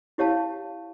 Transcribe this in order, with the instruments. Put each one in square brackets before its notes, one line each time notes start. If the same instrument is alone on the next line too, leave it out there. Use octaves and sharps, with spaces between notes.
[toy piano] E4 G4 C#5 F5 A5